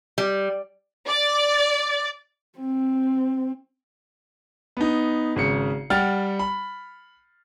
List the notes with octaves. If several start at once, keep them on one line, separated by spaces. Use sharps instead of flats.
G3
D5
C4
B3 D#4
G#1 C#3 C#7
G3 F#5 G5 F6 A6
B5